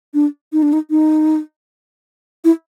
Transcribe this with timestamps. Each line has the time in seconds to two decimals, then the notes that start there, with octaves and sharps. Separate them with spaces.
0.14 D4
0.53 D#4
0.62 D4
0.73 D#4
0.90 D#4
2.45 E4